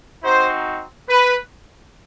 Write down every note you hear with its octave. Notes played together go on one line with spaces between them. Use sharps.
C4 D#4 F#4 C5
B4